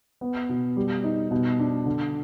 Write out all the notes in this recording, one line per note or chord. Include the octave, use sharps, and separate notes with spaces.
B3
B2
G3
D#4
B2
D4
D3